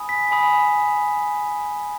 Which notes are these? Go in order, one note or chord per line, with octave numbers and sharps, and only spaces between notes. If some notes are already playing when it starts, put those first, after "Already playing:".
Already playing: G#5 B5 D#6
B6
G#5 B5 D#6